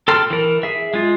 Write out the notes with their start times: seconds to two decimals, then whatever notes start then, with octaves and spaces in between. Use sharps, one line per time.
0.08 A4 G5 C6 F6
0.30 E3 A#4
0.63 G#4 E5
0.94 G#3 F4